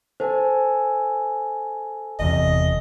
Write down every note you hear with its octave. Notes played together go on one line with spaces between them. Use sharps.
A4 C5 G#5
F#1 E2 C3 D#5